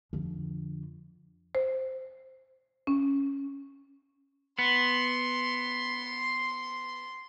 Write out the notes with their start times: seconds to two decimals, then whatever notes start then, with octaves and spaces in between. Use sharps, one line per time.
0.13 F2 D3
1.55 C5
2.87 C#4
4.59 B3 C6